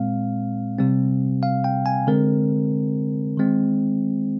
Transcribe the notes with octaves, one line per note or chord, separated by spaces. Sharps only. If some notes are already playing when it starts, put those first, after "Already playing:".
Already playing: A#2 G#3 C4 F5
C3 G3 C4
F5
G5
G#5
D3 G#3 C4 A#4
D#3 G#3 C4